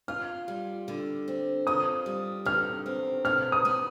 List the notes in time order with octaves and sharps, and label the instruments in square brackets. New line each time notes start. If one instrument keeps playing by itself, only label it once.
[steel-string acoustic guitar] F4 [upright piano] F6
[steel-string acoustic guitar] G3
D3
C4
[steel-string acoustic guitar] F4 [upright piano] D#6
[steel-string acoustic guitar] G3
[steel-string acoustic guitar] D3 [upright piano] F6
[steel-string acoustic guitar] C4
[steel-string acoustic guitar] B2 [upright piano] F6
[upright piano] D#6
[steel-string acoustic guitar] B3